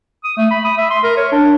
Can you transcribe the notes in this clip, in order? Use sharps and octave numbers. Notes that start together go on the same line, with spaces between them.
D#6
A3
B5
D#6
E5
C6
A#4
C#5
D4